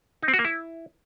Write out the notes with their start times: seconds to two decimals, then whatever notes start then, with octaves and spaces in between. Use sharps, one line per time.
0.23 D#4
0.28 C4
0.34 F#4
0.39 A#3
0.45 E4